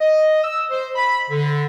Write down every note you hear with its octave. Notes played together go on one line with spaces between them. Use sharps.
D#5
E6
C5
B5
D3